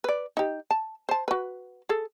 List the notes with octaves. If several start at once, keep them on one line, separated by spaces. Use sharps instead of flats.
B4 D5
D#4 G4
A5
C5 A5
F#4 B4
G#4 A4